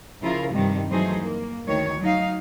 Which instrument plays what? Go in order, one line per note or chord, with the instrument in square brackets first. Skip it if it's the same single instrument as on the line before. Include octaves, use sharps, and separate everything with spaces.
[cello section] C#3 F3 E4 F4 A#4
G2 C3 D#3 F3 G3
E3 F#3 A3 D#4 G#4 C5
A#3
D2 D#3 C#5
F#3 D#4 F5